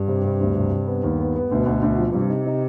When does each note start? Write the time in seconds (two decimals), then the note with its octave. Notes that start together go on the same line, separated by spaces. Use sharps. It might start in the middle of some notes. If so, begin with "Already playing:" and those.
Already playing: G2
0.08 C3
0.24 C3
0.41 D2
0.56 C3
0.72 C3
0.87 B3
1.03 D#2
1.20 B3
1.36 B3
1.51 D2 B2
1.66 D2
1.82 D2
1.98 F3
2.14 G2 C3
2.29 D#4
2.46 D#4